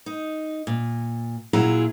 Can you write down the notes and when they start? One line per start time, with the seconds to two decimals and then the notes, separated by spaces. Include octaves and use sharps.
0.06 D#4
0.67 A#2
1.53 A#2 F#3 E4 F4 G#4 A#5